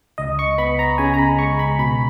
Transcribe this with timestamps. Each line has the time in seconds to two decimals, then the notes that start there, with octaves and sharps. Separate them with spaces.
0.18 C#2 D#5
0.39 C#6
0.58 B3 B5
0.79 A#5
0.98 C#3 G#5
1.14 A#5
1.18 B5
1.39 G#3 C#6
1.59 B5
1.79 B2 B5